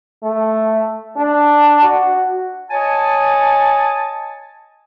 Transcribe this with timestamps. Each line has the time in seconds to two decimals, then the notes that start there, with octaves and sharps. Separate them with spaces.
0.23 A3
1.16 D4
1.82 F#4
2.71 C#5 D#5 G#5 A5